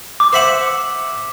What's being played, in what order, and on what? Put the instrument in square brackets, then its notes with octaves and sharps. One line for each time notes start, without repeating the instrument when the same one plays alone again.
[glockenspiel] D6
[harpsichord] C5 E5 F#5